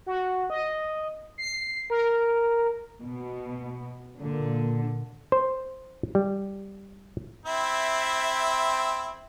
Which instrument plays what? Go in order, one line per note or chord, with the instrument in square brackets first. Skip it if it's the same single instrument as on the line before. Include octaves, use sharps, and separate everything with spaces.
[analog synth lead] F#4
D#5
C7
A#4
[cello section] B2
[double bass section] A#2 [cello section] D3
[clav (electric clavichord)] C5
G3
[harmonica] C4 E4 E5